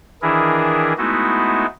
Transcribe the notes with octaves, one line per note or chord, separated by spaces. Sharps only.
D#3 E3 D4 E4 G#4 A#4
G#3 A3 B3 D#4 E4 F#4